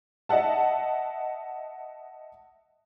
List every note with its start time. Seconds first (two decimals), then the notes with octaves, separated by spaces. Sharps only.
0.29 D#5 E5 F#5 A5